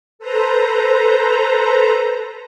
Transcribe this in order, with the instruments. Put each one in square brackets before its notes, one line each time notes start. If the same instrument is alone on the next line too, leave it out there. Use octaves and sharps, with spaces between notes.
[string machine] A4 B4 C5 A#5